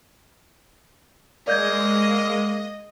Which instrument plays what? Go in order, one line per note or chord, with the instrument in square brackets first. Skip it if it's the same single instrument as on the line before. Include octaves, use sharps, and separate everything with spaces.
[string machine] G#3 [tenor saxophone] A#3 [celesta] D5 G6 G#6 [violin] D#5